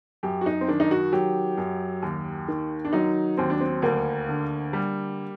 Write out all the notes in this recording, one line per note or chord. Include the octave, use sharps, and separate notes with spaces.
F#2 G4
F#4
D#4
C4
D#3 D4
D#4
F#4
F#3 G4
F#2
D#2
D#3
D4
F#3 D#4
D#2 C4
D4
C4
D2 A#3
D3
G3